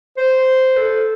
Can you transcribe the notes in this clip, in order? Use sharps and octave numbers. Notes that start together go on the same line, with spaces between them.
C5
A4